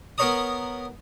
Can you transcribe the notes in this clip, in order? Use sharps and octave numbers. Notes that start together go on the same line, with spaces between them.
B3 A#4 B4 C#5 A#5 D#6